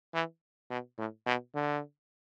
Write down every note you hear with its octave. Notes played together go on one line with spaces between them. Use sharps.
E3
B2
A2
B2
D3